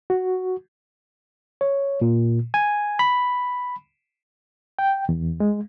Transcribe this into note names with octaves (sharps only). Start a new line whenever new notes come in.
F#4
C#5
A#2
G#5
B5
G5
E2
G#3